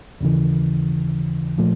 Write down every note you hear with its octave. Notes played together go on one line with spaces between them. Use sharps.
D#2 C#3 E3
A#2 F3 A3